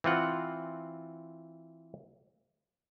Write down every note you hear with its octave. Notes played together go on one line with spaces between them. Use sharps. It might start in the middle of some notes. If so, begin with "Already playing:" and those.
E3 C4 F4 F#5